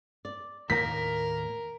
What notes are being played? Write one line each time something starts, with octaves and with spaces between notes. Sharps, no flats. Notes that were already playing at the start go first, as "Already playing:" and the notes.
D5
D#2 A2 A#3 A#4 A#5 B6